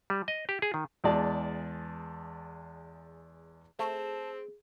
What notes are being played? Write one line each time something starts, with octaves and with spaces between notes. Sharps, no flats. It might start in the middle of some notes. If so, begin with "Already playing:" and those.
G3
D#5
G4
G#4
D#3
E2 G#3 D5 A5
A3 C4 G#4 A5